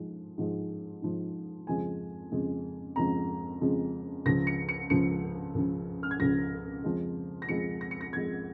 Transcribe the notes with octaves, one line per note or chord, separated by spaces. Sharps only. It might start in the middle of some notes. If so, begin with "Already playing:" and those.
Already playing: G#2 F3 G#3
G#2 F3 G#3
G#2 F3 G#3
F2 C#3 F3 G#3 G#5
F2 C#3 F3 G#3
F2 C#3 F3 G#3 A#5
F2 C#3 F3 G#3
C#2 C#3 F3 A#6
C#7
C#7
C#2 C#3 F3 C#7
C#2 C#3 F3
F6
G#6
C#2 C#3 F3 A#6
F2 F3 G#3
A#6
F2 F3 G#3 C#7
A#6
C#7
A#6
F2 F3 G#3 G#6